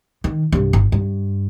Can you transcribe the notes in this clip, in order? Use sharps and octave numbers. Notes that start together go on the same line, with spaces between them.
D#3
C2 G2
G1
G2